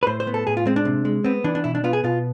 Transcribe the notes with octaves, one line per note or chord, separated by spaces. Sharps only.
B4
A2 C5
C5
B3
A4
A2 G#4
F4
G#3 C4
D4
C3
G#3
B3 C4
E3 D4
D4
B2 E4
D4
B3 F4
G#4
B2 F4